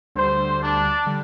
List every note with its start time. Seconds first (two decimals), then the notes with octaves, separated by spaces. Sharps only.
0.15 D2 D3 G3 C5
0.61 D4
1.06 D3 G3